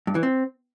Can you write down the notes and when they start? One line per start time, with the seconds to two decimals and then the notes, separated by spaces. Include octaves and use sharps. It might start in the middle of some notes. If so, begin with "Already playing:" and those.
0.07 G2
0.15 E3
0.23 C4